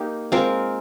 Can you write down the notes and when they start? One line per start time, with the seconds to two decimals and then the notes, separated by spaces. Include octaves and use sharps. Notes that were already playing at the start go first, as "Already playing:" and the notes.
Already playing: A#3 D#4 G4
0.32 G#3 C4 F4 A#4